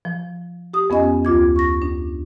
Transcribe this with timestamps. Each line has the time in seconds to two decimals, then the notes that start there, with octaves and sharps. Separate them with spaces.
0.05 F3
0.74 G4 D#6
0.90 F2 B3 C#4 D#5 G#5
1.25 D2 F4 D6 G#6
1.56 C#6 A#6
1.82 D4